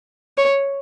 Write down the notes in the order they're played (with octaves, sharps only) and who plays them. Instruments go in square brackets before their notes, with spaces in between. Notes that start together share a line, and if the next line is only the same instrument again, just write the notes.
[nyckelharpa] C#5